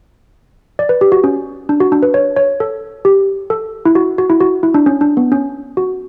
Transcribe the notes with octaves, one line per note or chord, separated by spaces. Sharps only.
D5
B4
G4
F#4
C#4
D4
F#4
D4
B4
C#5
C#5
A4
G4
A4
E4
F#4
F#4
E4
F#4
E4
D4
C#4
D4
B3
C#4
F#4